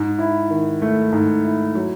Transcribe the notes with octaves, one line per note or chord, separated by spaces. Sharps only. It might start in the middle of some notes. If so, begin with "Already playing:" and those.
Already playing: G#2
E4
D#3
A3
G#2
E4
F#3